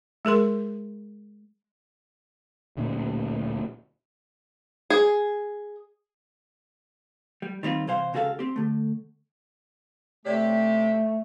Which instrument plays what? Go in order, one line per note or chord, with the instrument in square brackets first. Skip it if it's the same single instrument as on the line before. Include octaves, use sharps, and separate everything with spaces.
[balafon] G#3 G#4 A#4 C6
[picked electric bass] D1 D2 A#2 C#4
[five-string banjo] G#4
[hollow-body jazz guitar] G3
D#3 G3 C4 F4
C3 E3 C5 F5
C#2 C#3 F#4 G#4 A4 F5
C4 G4
D3 A3
[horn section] C3 G4 [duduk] A3 [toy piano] C#5 D5